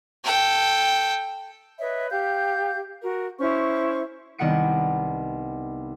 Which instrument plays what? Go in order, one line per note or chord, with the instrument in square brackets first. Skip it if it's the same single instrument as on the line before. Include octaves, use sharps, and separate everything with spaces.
[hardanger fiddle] A4 G5
[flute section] B4 C#5 D#5 E5
G4 F5 G6
F#4 A#4
C#4 E4 C5 C#6
[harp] C2 D#3 B3 F#5 C#7 D7